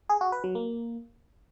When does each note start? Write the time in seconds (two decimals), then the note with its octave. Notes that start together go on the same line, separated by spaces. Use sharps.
0.09 G#4
0.21 F#4
0.32 B4
0.44 F#3
0.55 A#3